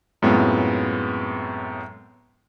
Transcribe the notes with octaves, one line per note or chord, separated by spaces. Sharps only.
F#2 A2 G#3 B3 C4 F4